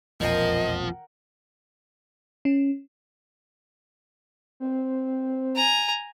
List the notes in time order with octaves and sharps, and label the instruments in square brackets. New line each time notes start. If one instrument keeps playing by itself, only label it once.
[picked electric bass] E1 A#1 F2 [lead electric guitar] F3 [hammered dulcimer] A#4 F#5 G5 [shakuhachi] D#5
[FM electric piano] C#4
[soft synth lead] C4
[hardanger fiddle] G#5 A#5